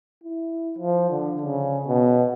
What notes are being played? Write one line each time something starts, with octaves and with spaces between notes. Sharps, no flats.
E4
F3
D3
C#3
B2